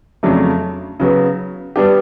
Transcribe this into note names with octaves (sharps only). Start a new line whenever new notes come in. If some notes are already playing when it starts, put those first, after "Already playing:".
F2 C#3 F#3 A3 D4
C#3 F#3 B3
G3 B3 D4 G4